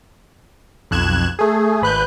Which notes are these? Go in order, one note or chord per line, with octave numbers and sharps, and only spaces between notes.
B1 F2 F#6 G#6 E7
A3 G#4
G#1 B4 F#6 G6